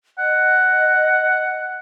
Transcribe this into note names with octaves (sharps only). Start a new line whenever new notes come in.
D#5 F#5